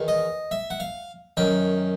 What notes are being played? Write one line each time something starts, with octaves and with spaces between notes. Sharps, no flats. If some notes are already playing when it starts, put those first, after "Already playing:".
Already playing: E2 D#3
D#5
E5
F#5
F5
F#2 D#3 G5